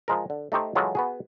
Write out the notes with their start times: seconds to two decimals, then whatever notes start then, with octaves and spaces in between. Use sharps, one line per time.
0.08 F3 G#3 A#4
0.30 D3
0.52 A3 D#4 G4 C5
0.75 E3 F#3 G#3 F4 A4
0.95 B3 F#4 G#4